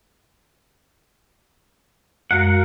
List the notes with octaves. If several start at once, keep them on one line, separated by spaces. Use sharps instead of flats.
F#2 G#3 F#4 A#4 F5 F#5